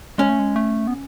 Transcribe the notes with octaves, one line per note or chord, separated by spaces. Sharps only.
G#3 C#4
A3
G#3
A3
B3